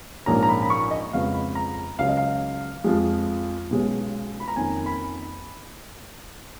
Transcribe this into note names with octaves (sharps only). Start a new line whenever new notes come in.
A#1 G#2 F3 A#3 C#4 A#5
A#5
B5
B5
C#6
D#5
F2 C#3 G#3 B3 F5
B5
A#5
C#2 C#3 F#3 C#4 F5
D#5
F5
F2 F3 G#3
B1 B2 G#3 C#4
B5
A#5
F2 D#3 A#3 C#4 G#5
B5